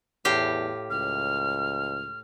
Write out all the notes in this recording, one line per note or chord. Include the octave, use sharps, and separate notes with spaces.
E2 A2 G4 F5
C#2 F6